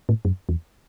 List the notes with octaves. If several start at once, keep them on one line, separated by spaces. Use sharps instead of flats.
A2
F#2
E2